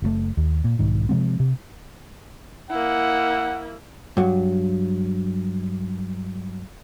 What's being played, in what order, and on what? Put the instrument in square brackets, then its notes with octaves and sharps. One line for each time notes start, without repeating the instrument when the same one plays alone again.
[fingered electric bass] F#1 A2 A3
D#2
A#2
B1 G#2 D#3
C3 F3 G#3 C4
C3
[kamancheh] A#3 E4 [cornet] F#5
[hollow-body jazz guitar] G2 F#3